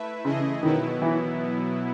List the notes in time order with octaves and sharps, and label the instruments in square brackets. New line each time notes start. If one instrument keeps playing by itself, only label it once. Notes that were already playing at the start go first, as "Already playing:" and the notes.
Already playing: [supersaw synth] A3 E4 B4 E5
[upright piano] C#3 [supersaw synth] E3 A3 E4 G#4 D#5
[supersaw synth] B2 F#3 B3 E4 [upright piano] D#3
[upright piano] E3